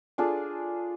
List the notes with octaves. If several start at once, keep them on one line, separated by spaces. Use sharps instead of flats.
D4 F4 G#4 A4